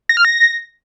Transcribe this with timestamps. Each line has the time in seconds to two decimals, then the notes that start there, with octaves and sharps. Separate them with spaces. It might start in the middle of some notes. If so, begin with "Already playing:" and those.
0.09 A#6
0.17 F6
0.25 A#6